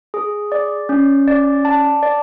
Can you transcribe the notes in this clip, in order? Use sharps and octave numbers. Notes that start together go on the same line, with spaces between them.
G#4
D5
C#4
D5
A5
D5